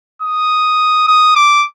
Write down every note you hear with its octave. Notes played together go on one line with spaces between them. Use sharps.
D#6
D#6
D6